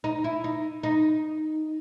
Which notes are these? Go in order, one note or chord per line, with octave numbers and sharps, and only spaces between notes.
D#4
E4
D#4
D#4